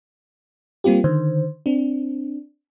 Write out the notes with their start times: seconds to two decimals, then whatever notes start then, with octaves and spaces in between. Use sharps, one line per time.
0.84 G3 A#3 C4 F4 G4
1.04 D3 D#3 C5
1.66 C4 D4